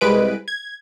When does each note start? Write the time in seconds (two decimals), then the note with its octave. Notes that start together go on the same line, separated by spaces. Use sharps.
0.01 C2 G#3 B4 D7
0.48 G#6